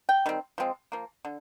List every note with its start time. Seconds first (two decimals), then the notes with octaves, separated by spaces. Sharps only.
0.09 G5
0.26 D#3 G3 C4
0.58 F3 G#3 C4
0.92 F3 A#3
1.25 D3